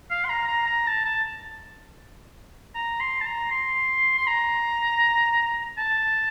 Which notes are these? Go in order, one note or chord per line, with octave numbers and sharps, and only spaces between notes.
F5
C6
A#5
A#5
A#5
A5
A5
A#5
C6
A5
A#5
C6
C6
A#5
A5